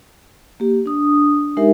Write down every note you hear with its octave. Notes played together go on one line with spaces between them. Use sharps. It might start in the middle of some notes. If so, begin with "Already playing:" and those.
A#3 G4
D4 D#6
G#3 D#4 G4 A#4 E5